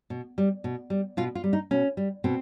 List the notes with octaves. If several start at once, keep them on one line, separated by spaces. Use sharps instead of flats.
B2
G3
B2
G3
B2 F4
F4
G3
D#4
B2 C#4
G3
B2 C4